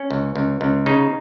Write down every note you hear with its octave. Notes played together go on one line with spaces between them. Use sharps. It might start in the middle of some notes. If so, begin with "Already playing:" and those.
Already playing: C#4
C#2
C#2
C#2
C#3 D#4